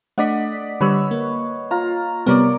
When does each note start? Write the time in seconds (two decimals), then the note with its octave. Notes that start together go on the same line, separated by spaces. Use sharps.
0.18 A3 D4 D5 D#5 F#5 B6
0.81 D3 G3 B4 C#5 E6
1.11 A#3
1.71 F4 A#5
2.26 C3 G3 B3 A#4 C#5 D5